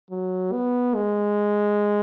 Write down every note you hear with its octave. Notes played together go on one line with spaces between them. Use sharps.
F#3
B3
G#3